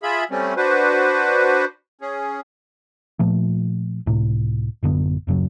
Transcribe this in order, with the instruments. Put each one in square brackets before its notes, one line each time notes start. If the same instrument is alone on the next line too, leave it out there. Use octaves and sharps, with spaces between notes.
[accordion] F4 G#4 E5 B5
G3 A3 C4 C#4
D4 F#4 B4 C5
C#4 G#4
[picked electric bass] A#2 F3 A3
C#2 A2 C3
A1 F#2 D3 B3
D1 F#2 C#3 F#3